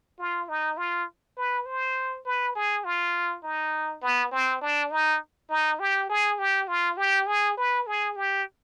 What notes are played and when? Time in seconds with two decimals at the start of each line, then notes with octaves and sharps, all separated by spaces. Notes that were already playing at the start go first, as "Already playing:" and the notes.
0.19 F4
0.49 D#4
0.77 F4
1.37 B4
1.66 C5
2.26 B4
2.55 G#4
2.85 F4
3.43 D#4
4.02 B3
4.32 C4
4.62 D4
4.91 D#4
5.50 D#4
5.79 G4
6.10 G#4
6.39 G4
6.68 F4
6.97 G4
7.27 G#4
7.57 B4
7.87 G#4
8.16 G4